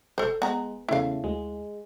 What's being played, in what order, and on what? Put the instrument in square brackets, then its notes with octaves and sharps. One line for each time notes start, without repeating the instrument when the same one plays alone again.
[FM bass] E1 [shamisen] A4 C5
[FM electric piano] G#3 [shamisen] B3 A#5
[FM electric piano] E2 C#3 A3 [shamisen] E4 F5
[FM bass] D2 [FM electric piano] G#3